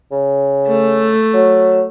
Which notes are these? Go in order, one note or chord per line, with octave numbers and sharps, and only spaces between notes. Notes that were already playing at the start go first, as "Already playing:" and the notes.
C#3
A3
F#3